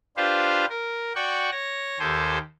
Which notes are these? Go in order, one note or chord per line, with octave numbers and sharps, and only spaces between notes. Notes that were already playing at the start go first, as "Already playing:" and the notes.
D4 F4 G4 B4 C5 F5
A#4
F#4 D5 F#5 G5 C#6
C#5 A#6
D#2 G4 A4 C5 G#5